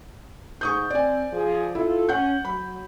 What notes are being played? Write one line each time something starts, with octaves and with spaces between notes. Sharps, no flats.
G#2 C#6 D#6 G6
C4 D5 G#5
F3 G#4
E4 F4 A4
C#4 F#5 G6
F#3 B5